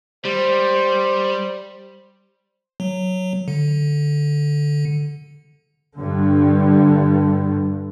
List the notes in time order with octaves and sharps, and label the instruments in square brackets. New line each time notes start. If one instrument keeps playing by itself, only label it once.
[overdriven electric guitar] G3 [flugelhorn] C5
[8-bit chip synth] F#3
D3
[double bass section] G2 D3